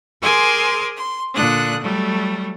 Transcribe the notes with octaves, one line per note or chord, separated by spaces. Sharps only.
G#4 A#4 C5 G#5 C6 D6
C6
A#2 D3 D4 D#6 F#6
F#3 G3 A3